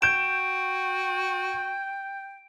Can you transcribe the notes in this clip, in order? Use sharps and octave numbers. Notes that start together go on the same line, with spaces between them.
F#4 G5 G6 D7 E7